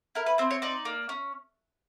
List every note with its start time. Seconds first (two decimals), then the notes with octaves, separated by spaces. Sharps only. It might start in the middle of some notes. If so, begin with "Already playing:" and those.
0.15 E4 A#4
0.26 B4
0.38 C4 C5
0.51 C#5
0.62 D#4 D5
0.85 A#3
1.09 C#4